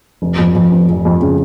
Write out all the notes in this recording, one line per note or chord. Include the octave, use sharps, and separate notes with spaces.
F1
F2
F2
F1
F1
F2
C#3